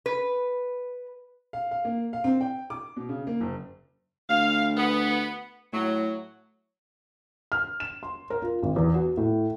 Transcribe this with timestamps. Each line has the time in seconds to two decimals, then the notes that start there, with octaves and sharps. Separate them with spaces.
0.06 B4
1.53 F5
1.71 F5
1.85 A#3
2.13 F5
2.24 C4
2.41 G5
2.70 D6
2.96 B2
3.09 C#3
3.27 A#3
3.41 F#1
4.29 D2 F5
4.77 B3
5.73 A2 F#3
7.52 F6
7.80 E7
8.03 C6
8.30 A#4
8.42 F4
8.63 G#1
8.76 E2
8.94 F#4
9.17 A2